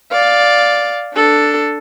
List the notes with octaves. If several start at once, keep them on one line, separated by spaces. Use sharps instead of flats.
D5 F5
D4 A4